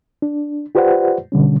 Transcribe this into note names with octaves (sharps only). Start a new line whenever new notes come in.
D4
F4 G4 B4 C5 D5 F#5
B2 D3 G3 C#4